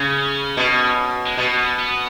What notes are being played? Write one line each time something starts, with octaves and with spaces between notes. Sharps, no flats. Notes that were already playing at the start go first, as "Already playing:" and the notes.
Already playing: C#3 C#4
B2
G#3
B2 B3
B3